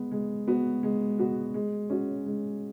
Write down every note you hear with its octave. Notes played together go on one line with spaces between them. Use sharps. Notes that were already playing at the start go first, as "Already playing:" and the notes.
Already playing: G#3 B3
G#3
B3 F#4
G#3
B3 F#4
G#3
C#4 F#4
G#3